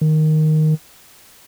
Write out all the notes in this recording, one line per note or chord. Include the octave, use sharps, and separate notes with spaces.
D#3